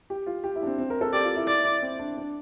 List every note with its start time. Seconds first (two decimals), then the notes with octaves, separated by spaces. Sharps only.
0.10 G4
0.26 F4
0.44 G4
0.56 E4
0.63 D4
0.67 C4
0.78 C4
0.90 A#4
1.01 A4
1.13 G4 D5
1.24 F4
1.36 E4
1.47 E4 D5
1.65 E4
1.82 C4
1.99 D4
2.17 D4